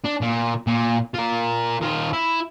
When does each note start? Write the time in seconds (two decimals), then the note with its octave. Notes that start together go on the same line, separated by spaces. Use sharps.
0.04 D4
0.21 A#2
0.67 A#2
1.15 F4 A#4
1.82 D#3 F4
2.13 E4